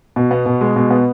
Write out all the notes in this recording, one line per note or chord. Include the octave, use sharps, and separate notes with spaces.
B2
B3
B2
G#3
B2
B3